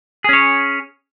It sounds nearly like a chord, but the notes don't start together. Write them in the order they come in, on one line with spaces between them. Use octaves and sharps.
G#4 C#4 C#5